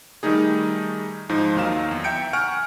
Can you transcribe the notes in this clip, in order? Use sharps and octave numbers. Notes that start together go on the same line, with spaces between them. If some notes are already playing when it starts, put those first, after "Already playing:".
D#3 G3 A3 D#4 G#4
G#2 F3 D#4
D#2 D#3 F#3 D#4 F5 E7
E2
E5 G5 A#5 G6 C#7 D7
F#5 G#5 C#6 F6 D7